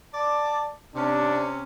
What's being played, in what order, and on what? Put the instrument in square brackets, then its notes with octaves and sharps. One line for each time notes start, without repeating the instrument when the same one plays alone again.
[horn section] D5 [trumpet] A5
[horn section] C3 C#4 [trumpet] D4